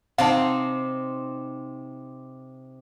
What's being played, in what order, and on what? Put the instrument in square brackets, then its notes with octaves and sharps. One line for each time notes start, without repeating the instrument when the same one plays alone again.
[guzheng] C3 C4 D#4 [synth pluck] F5 F#5 A5